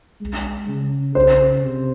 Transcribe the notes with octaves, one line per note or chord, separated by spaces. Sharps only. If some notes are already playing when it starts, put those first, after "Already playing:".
G#3
C#3
C#3 C5
C3